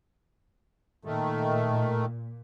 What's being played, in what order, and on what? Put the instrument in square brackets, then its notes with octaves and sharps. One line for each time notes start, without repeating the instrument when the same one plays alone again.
[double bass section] A#2 [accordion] D#3 A3